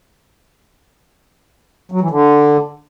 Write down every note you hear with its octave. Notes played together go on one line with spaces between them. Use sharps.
F#3
E3
D3